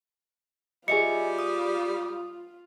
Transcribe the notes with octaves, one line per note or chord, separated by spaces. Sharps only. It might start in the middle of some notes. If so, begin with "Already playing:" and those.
G3 F4 G#4 D#5 E5 G#5 C#7
D#6